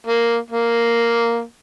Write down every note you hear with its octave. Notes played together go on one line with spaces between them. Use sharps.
A#3
A#3